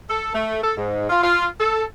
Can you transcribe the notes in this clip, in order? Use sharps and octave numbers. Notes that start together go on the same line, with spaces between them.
A4
A3
A4
G#2
F4
F4
A4